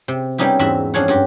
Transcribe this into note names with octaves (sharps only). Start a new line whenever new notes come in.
C3
G3 B3 C#4 D#4 E4 G4
E2 G#2 C4 F#4 E5 B5
F2 C#4 D4 G#4 C#5 F#5
G2 F#4 G4